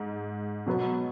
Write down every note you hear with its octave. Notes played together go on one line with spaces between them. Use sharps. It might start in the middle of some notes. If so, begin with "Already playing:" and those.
Already playing: G#2
B2 F#3 B3